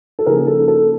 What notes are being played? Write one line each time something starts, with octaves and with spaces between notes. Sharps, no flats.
A4
C#3 F3 A#3 D#4 G#4 A#4
A4
A4